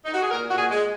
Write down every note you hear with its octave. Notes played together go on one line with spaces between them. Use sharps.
D#4
F#4
G#4
A#2 A#4
A#2 F#4
G#4
G#3